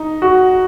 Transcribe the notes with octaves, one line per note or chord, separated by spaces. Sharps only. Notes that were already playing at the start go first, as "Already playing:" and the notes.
Already playing: D#4
F#4